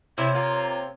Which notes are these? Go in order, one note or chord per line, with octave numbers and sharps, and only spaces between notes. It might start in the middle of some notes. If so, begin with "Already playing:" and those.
C3 E4 C#5
A#3 F4